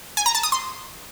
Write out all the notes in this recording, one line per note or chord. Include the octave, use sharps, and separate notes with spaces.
G#5
A#5
A5
D#6
C6